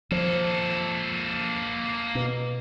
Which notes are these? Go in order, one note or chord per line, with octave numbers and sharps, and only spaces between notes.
F3 A#3 A4
B2